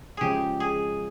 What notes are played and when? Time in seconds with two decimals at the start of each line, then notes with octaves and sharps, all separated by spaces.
0.17 C#3 F3 G#3 G4 G#4
0.60 G#4